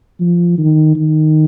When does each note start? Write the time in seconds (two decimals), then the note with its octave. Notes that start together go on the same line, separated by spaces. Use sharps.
0.20 F3
0.58 D#3
0.96 D#3